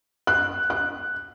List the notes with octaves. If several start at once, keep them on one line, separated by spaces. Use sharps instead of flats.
F#6
F#6